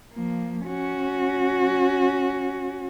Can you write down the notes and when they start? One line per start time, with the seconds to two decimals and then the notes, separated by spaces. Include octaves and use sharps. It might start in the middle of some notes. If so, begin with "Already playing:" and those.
0.13 F3 A#3
0.66 C#4 F#4